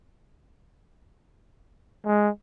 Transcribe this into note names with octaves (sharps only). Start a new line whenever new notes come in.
G#3